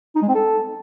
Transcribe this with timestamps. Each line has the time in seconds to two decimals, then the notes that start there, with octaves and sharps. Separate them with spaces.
0.16 D#4
0.22 G#3
0.29 C4
0.35 A4